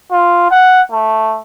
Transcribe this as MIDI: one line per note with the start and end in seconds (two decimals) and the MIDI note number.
0.12 0.49 65
0.51 0.82 78
0.91 1.39 57